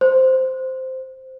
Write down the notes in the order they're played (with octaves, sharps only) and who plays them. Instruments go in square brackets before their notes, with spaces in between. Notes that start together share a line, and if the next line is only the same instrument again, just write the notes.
[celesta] C5